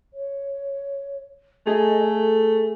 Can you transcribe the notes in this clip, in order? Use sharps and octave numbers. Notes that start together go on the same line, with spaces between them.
C#5
A3 G#4 D#5
A4